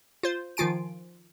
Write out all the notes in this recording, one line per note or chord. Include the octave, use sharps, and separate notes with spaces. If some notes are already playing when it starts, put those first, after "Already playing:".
F4 C5
D#3 F3 F4 G#5 D7